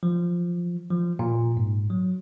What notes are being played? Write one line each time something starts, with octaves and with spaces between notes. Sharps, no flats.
F3
F3
A#2
G#2
F#3